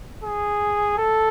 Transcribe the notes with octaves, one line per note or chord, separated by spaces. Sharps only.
G#4
A4